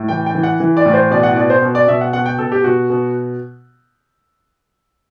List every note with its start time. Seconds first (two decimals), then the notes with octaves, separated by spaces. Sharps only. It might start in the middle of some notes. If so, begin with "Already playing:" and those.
Already playing: A2
0.08 E3 G5
0.26 G5
0.35 E3
0.43 F#5
0.60 E3
0.77 D5
0.86 A2
0.94 C5
1.11 B2 D5
1.23 F#5
1.36 B2 D5
1.50 C5
1.62 B2
1.75 D5
1.87 B2 E5
2.01 F#5
2.13 B2 F#5
2.26 G5
2.38 B2 A4
2.52 G4
2.64 B2 F#4
2.90 B2